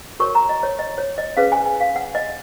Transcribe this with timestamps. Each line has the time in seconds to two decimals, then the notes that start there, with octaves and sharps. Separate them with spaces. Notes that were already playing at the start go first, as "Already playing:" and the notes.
0.20 F#4 A#4 C#5 C#6
0.35 A#5
0.49 D#5
0.63 C#5
0.79 D#5
0.98 C#5
1.18 D#5
1.37 C#4 G#4 B4 F5
1.52 G#5
1.65 G#5
1.80 F5
1.96 F#5
2.15 D#5